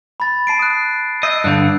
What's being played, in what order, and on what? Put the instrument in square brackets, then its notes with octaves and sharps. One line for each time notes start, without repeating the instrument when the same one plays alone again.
[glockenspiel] B5 A6
A5 C7 D7
D#6 F#6
[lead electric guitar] D#5 [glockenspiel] E6 G6
[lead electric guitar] G2 D3 [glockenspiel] F#6 G6